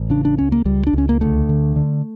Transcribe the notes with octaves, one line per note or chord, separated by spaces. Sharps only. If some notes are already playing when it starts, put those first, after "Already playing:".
Already playing: A1
C#3 D4
D4
C#2 C#4
A#3
C#2 G3
D4
C#2 C#4
A#3
D2 A3
D3
D3